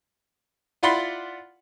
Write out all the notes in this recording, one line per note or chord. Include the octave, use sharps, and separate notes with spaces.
E4 F4 D5 F#5 B5 C6